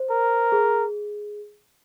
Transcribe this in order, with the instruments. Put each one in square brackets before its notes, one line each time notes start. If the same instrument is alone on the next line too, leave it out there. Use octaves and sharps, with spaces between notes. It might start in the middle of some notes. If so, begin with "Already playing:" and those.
Already playing: [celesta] C5
[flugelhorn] A#4
[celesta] G#4